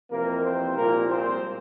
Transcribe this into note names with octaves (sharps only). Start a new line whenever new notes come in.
F2 C3 E3 A#3 A#4
C4 C5
C2 A#2 F3 G#3 A#3 A#4
C4 C5